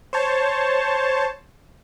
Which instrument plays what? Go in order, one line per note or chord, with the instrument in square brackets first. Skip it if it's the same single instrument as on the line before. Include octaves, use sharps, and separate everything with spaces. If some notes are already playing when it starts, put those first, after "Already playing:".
[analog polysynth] C5 C#5 A5